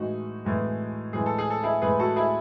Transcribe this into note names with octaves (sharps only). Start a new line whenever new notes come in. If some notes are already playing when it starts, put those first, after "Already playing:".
Already playing: A2 E3 G#3 D#4 F#4
A2 E3 G#3
A2 E3 G#3 G#4
A4
G#4
A4
E4 G#4
A2 E3 G#3 G#4 B4
F#4 A4
E4 G#4